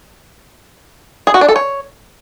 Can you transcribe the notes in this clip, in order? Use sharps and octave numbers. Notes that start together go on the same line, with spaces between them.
G#4
F#4
D4
A4
C#5